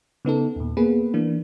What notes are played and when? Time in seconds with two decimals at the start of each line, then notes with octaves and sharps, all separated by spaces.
0.25 C#3 B3 D#4 A4
0.56 D#2 A#2
0.77 A#3 B3 G#4 B4
1.14 E3 A#3 D4